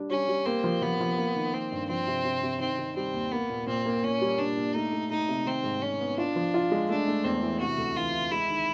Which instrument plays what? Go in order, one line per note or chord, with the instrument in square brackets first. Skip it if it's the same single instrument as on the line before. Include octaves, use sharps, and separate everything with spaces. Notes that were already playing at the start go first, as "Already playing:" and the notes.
Already playing: [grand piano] G3 D4
[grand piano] G3 [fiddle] C#4
[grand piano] G3
[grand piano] A#3 [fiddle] C4
[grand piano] F3
[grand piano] F3 [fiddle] B3
[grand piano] F3
A#3
D#3
[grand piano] A#3 [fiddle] C4
[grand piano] G2
[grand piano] F3 [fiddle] C4
[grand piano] C3
C3
C3
[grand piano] D#3 [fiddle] C4
[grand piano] D#3
[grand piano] G3 [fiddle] C4
[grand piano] D#2
[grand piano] A#3 [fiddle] B3
[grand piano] A#2
[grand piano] A#2 [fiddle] C4
[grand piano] A#3
[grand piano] A#2 [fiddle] C#4
[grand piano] G3
[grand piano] A#2 [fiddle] D4
[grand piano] A#2
[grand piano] A3 [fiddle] D#4
[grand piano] A3
[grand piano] A3 [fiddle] D#4
[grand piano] C3
[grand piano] D#3 [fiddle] C4
[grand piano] G#2
[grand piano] D#3 [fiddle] C#4
[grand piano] B3
[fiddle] D4 [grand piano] F4
[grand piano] F3
F4
G#3
[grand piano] A3 [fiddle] D4
[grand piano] A3
[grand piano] E2 [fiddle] C4
[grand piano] E3
[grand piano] C3 [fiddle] F#4
[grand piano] D2
[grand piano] E3 [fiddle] F4
[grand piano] E3
[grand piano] G#3 [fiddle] E4
[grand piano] D#3